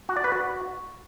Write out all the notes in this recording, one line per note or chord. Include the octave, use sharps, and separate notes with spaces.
F#4
D5
B4
F#4